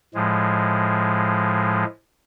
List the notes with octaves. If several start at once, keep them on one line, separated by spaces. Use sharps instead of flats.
A2 F3 G#3